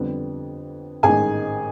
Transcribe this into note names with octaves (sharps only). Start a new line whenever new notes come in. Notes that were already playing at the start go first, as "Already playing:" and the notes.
Already playing: F2 D3 G3 B3
A1 G#2 D#3 G#4 G#5